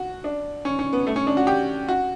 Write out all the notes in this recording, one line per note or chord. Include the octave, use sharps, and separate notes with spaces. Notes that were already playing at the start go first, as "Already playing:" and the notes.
Already playing: F#4
D4
C#4
C#4
B3
A3
C#4
D4
F#4
G4
F#4